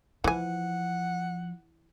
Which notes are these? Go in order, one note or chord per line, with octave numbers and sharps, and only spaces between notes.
E3 F3 F#5 G#5